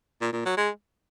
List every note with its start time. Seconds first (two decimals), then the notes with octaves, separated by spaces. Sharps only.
0.21 A#2
0.32 A#2
0.45 F#3
0.57 G#3